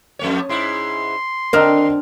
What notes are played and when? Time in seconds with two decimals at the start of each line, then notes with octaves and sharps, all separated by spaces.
0.19 F2 A3 C#5
0.49 G#2 E4 C6
1.53 D3 C4 D4 A#4 D#5 F6